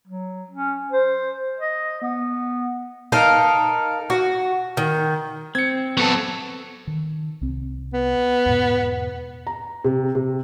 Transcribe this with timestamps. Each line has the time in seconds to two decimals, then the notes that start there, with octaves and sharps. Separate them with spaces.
0.07 F#3
0.51 C#4
0.92 C5
1.59 D#5
2.02 B3
3.12 D#4 A4 A#4 F5
4.10 F#4
4.77 D#3
5.55 C4 G#6 C#7
5.97 F#3 B3 A4 A5
6.87 D#3
7.41 C2 C4
7.94 B3
8.46 E2 G#2 B2
9.47 A#5
9.84 C3
10.15 C3